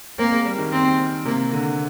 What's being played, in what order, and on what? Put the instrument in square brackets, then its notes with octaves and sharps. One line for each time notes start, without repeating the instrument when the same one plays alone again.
[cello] A#3 [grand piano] C4
[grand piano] G#3
G3
D#3
[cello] C4
[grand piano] C3 [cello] A#3
[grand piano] D3